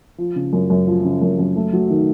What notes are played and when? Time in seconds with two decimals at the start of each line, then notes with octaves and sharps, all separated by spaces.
0.18 F3
0.36 C#3
0.53 F#2
0.70 F#2
0.87 F3
1.05 C#3
1.22 F#2
1.39 F#2
1.56 A3
1.73 F#3
1.90 D#3